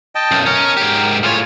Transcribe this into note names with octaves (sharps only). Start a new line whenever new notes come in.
D#5 G5 A5
B1 F#2
C#4 A#4 C#5
G#2 G4
A2 F4 C#5 G#5 F6